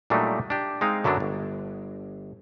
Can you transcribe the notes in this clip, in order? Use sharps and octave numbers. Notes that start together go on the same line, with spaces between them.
A#2 F#3 G3 A3 D4 D#4
D4 G4
G#3 C4 D#4 F5
F#2 D3 F#3 B3 D4
G1